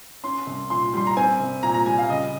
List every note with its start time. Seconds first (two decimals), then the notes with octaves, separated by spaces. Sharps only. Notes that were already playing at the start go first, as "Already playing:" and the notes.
0.24 C#4 C6
0.47 C2
0.70 A#2 C6
0.94 G3 C6
1.07 A#5
1.17 C4 G#5
1.40 C2
1.63 A#2 A#5
1.74 A#5
1.86 G3 G#5
1.98 F5
2.09 C#2 D#5